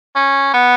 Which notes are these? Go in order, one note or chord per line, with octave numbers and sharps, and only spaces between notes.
C#4
B3